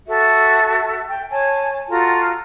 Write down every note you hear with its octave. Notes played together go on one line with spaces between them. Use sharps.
F#4 A4 E5
G5
C#5 G#5 A5
F4 F#4 A4 A#5